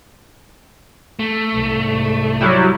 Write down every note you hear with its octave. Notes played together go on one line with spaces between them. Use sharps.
A3
C2 G#2
F#3 G3 E4